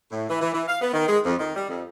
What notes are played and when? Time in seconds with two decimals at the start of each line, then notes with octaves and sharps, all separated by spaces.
0.11 A2
0.29 E3
0.40 E3
0.53 E3
0.68 F5
0.81 B3
0.93 D#3
1.07 G#3
1.24 F2
1.38 D#3
1.55 G3
1.68 F2